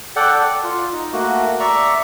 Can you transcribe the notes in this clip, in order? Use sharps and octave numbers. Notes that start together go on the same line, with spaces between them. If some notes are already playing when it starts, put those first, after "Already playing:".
A4 D5 F#5 G5
D5
F4
D#4
A3 A#3 F#4
D5 E5 A#5 C#6